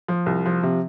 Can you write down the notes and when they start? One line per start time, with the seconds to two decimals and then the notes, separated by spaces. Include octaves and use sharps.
0.08 F3
0.26 C2
0.46 F3
0.63 C3